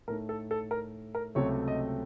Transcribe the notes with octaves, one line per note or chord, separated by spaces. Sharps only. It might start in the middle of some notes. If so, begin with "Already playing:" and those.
A2 A3 D#4 A#4
A4
A4
A#4
A#4
C#2 C3 F#3 A3 C4 C#5
D#5